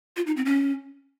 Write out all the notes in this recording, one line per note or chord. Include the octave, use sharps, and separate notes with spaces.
F4
D#4
C4
C#4